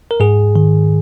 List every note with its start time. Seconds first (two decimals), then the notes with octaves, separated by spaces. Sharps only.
0.11 A#4
0.20 G#2 G#4
0.56 D#3